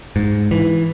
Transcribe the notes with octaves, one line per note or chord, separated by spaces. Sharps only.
G#2
E3